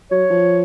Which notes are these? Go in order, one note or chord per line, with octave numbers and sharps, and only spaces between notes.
F#3 C#5
F3